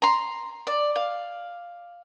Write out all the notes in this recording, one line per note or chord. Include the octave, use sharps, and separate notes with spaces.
A#5 C6
D5
F5